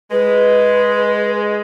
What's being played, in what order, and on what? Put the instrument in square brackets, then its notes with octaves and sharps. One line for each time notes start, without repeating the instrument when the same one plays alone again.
[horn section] G#3 [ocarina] B4